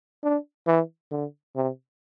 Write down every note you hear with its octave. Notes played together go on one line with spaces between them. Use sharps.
D4
E3
D3
C3